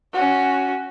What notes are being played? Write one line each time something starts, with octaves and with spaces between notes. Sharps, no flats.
C#4 F#4